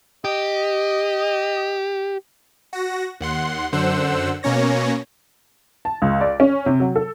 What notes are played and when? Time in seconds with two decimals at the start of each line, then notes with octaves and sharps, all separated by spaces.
0.25 G4 D#5
2.73 F#4 A#6
3.20 D#2 F#5 C6
3.72 F#2 D3 C5 F#5 E6
4.43 B2 A#3 C#4 C#5 A#6
5.85 A5
6.02 C#2
6.21 D5
6.40 C#4
6.66 C3
6.80 F#3
6.96 A4